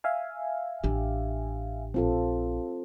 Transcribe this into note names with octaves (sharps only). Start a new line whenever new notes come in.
E5 F5 G#5
A1 D4 G4
A#1 C4 F4 A4